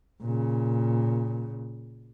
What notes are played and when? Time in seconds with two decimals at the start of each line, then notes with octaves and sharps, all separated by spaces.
0.21 A#2 C#3